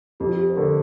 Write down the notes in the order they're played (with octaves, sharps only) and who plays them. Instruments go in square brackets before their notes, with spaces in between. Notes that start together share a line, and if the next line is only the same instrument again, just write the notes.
[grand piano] F2 [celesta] G4
[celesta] F4
G4
C5
[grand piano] D3 A3 [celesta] A#4